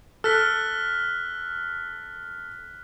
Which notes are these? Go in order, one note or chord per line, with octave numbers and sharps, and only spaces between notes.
A4 F6 F#6 B6